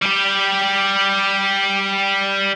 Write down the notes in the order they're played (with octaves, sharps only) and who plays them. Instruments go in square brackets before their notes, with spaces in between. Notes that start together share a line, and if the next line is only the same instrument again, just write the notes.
[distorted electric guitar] G3 G4